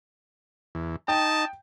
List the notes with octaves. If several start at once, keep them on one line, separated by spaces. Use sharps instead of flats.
E2
D#4 D#5 G5 A5